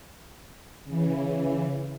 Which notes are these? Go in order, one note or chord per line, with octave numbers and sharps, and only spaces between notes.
C#3 E3